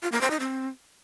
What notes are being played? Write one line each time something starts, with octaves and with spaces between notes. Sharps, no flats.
F4
A#3
C5
D#4
C4